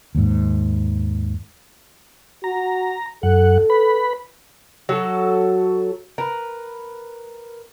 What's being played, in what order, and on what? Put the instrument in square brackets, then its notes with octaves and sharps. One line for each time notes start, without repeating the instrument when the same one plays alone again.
[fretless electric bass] D#2 G#2
[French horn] F#4 [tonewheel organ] A#5
[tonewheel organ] F#2 F#5 [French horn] A4
[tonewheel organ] B4 B5
[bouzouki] F#3 F#4 A4
A#4 B4